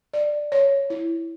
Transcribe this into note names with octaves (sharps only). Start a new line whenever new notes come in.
D5
C#5
E4